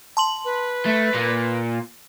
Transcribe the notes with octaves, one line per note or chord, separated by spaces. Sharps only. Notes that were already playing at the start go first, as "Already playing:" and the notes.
A5 C6 F#7
B4
A3
A#2 A#3